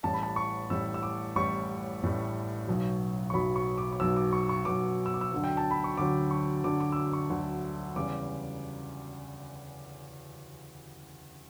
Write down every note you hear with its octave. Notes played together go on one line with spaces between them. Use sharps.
A1 A2 G3 A5
B5
A5
C#6
A1 A2 G3 E6
E6
D6
A1 A2 G3 C#6
A1 A2 G3
B1 B2 F#3
C#6
B1 B2 F#3 B5
C#6
D6
D6
B1 B2 F#3 E6
D6
C#6
C#6
B1 B2 F#3 D6
E6
D6
E6
D2 D3 F#3
G5
A5
B5
C#6
D2 D3 F#3 D6
C#6
D2 D3 F#3 D6
D6
E6
D6
C#6
D2 D3 F#3
E2 C#3 G3 D6